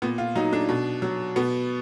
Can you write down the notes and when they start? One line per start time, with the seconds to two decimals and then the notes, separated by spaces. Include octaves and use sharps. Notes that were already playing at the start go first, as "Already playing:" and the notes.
0.02 A#2 B3
0.18 F4
0.36 F#3 D#4
0.53 D4
0.69 B2
1.02 F#3
1.36 B2 B3